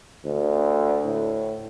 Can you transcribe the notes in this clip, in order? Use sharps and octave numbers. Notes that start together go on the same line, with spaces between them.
D2
A2